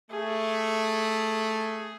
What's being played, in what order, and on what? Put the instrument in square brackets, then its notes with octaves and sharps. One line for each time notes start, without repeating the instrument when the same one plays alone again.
[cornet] A3 [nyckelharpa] G#4